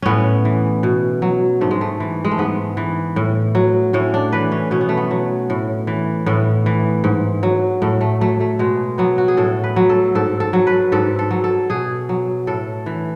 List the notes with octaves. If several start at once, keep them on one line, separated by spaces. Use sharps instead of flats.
A2 B3 C#4
E3
B2
F#3
G#2 A3
G#3
A3
E3
G#3
A3
G#2 B3
E3
A2
F#3
A2 C#4
D4
E3 B4
C#4
B2 C#4
B3
A3
B3
F#3
A2
E3
A2 B3
E3
G#2
F#3
A2 A3
A3
F#3 A3
A3
B2 G#3
F#3 B3
F#4
G#4
A2 A4
B4
F#3
A4
G#2 A4
A4
F#3
B4
G#2 A4
A4
F#3
A4
B2 G#4
F#3
A2 A4
E3